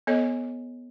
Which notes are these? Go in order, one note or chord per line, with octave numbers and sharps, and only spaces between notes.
B3 A4 C#5 D#5